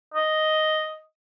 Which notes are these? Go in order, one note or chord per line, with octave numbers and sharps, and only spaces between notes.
D#5